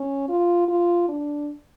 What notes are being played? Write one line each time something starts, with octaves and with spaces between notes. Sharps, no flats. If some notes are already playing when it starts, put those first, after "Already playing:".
Already playing: C#4
F4
F4
D4